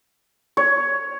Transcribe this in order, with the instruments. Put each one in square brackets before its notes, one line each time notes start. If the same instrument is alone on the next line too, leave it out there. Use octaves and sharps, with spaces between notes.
[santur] C#5